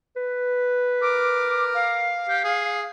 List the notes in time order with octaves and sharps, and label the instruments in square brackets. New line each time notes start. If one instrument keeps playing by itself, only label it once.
[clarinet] B4
[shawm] A#4 [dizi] D6
[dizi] F5
[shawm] G4
G#4